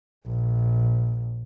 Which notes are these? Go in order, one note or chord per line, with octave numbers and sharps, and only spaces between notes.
A#1